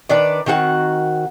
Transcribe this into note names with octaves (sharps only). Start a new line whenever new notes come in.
D#3 D4 B4 D5
D#3 C4 F#4 F#5